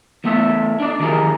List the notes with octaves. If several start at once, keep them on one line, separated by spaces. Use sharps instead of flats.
E2 A3 B3 A4 D#5 E5
D4 D#4 D5
D#3 E3 G#3 G4 G#4 A#4